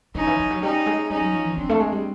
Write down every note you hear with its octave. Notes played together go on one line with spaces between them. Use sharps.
D#3 C#4 D#4
E3
F3
F#3
G3 C#4 D#4
G#3
G3 C#4 D#4
F#3
F3
E3
F3 C4 D4
A3
G#3
G3